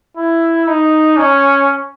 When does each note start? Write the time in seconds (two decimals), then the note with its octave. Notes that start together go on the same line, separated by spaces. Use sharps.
0.16 E4
0.68 D#4
1.17 C#4